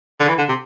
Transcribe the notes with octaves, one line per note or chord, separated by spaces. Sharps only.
D3
E3
D3
C3